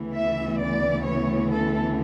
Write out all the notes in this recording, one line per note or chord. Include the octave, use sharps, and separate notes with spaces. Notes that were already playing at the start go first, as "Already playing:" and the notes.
Already playing: D2 C#3 E3 B3
E5
D5
C#5
A4